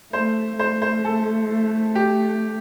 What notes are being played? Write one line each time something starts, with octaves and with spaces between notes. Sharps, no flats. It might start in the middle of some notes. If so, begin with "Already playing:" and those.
A3 C5
A3 C5
C5
A4
G4